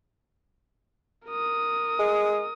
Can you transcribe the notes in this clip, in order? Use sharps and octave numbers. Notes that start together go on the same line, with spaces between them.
A#4 D#6
G#3